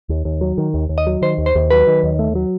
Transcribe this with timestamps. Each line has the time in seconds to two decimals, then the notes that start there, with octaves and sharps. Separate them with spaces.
0.09 D#2
0.25 D#2
0.41 F#3
0.58 D#3
0.74 D#2
0.89 D#2
0.98 D#5
1.07 F#3
1.22 D#3 C5
1.38 D#2
1.46 C5
1.55 D#2
1.70 F#3 B4
1.87 D#3
2.03 D#2
2.19 A3
2.35 F#3